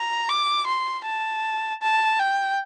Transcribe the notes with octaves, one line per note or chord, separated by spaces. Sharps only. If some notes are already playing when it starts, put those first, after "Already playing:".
Already playing: A#5
D6
C6
A5
A5
G5